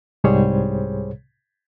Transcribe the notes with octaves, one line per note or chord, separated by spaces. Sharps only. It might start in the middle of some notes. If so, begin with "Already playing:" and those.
C2 G#2 G3 G#4 C5 C#5